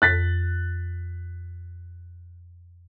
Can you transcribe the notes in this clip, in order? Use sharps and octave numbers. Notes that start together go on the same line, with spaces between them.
F2 F#6 A6 B6